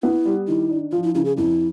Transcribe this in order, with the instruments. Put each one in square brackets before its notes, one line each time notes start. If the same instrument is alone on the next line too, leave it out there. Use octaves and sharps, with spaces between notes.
[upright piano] B3 [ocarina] E4
[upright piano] G3
[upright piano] D#3 [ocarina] E4
[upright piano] D4
[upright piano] F3 [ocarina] F4
[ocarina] E4
[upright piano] C#3 [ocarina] E4
[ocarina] G#4
[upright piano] F2 [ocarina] E4